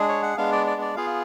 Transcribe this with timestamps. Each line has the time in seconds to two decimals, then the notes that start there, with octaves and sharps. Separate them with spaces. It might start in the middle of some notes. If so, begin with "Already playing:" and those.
Already playing: G#3 D4 G#4
0.09 C#5
0.23 F#5
0.37 G#3 B3 D4 F5
0.52 D5
0.67 D5
0.81 D5
0.96 B3 F4 G#4 F5